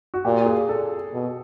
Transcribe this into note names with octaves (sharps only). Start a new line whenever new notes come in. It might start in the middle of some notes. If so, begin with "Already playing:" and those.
F#4
A#2 G4
G#4
A4
B2